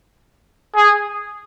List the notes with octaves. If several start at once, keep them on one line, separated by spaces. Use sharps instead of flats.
G#4